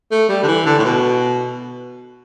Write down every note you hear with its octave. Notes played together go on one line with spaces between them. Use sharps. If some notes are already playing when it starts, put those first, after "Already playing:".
A3
G3
D3
E3
D3
A2
B2